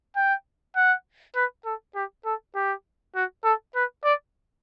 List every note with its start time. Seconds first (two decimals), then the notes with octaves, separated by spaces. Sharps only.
0.16 G5
0.76 F#5
1.36 B4
1.65 A4
1.95 G4
2.25 A4
2.55 G4
3.15 F#4
3.44 A4
3.75 B4
4.04 D5